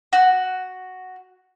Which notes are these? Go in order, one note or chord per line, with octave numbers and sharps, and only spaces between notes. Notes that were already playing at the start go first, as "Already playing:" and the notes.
F#4